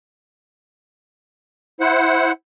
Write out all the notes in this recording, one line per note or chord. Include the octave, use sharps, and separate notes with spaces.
E4 C5 F#5